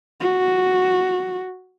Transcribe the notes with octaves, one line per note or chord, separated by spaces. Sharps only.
F#4